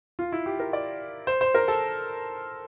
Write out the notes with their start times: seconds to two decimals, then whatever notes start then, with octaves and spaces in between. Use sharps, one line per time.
0.19 F4
0.32 E4
0.46 G4
0.60 A#4
0.73 D5
1.27 C5
1.41 C5
1.55 A#4
1.68 A4